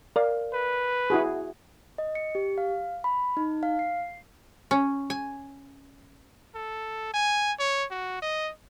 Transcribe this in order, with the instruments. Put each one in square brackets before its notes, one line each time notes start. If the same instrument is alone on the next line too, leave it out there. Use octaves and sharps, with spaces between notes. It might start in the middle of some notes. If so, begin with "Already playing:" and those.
[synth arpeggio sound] A#4 D5 [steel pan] F5
[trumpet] B4
[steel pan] E4 F#4 G#4
[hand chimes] D#5
C#7
G4
F5
B5
D#4
F5
C7
[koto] C#4
G#5
[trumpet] A4
G#5
C#5
F#4
D#5